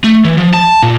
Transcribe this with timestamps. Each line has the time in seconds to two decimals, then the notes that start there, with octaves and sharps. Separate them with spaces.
0.04 A3
0.25 E3
0.38 F3
0.53 A5
0.83 A#2